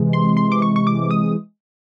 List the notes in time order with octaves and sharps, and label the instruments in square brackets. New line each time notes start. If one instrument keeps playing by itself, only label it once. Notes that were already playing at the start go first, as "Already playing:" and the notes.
Already playing: [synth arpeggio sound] C3 E3 G#3
C6
C6
D6
C#6
C#6
D6
D#6